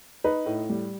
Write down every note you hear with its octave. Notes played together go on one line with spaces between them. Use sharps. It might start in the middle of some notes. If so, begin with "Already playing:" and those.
D#4 B4
A2
G3